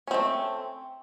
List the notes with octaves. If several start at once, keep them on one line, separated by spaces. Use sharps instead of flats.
A3 C4 C#4